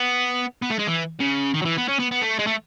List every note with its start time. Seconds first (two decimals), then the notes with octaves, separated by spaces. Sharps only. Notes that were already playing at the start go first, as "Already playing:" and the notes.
Already playing: B3
0.62 B3
0.70 A3
0.79 G#3
0.87 E3
1.20 C#3
1.54 D#3
1.62 F#3
1.65 E3
1.78 B3
1.88 C#4
1.99 B3
2.11 B3
2.21 A3
2.39 G#3
2.47 A3